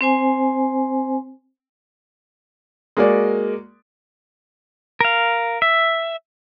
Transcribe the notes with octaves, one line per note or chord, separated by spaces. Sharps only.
C4 C5 G#5
G#3 A#3 F#4 D5
A#4 F5
E5